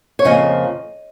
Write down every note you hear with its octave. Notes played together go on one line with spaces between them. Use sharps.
C#5
F2 C#3 F3 A#3 D#5